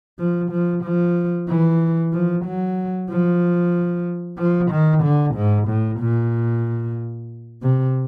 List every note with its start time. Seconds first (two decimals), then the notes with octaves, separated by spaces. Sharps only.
0.19 F3
0.51 F3
0.84 F3
1.49 E3
2.13 F3
2.45 F#3
3.10 F3
4.38 F3
4.71 D#3
5.03 D3
5.35 G#2
5.68 A2
6.00 A#2
7.62 C3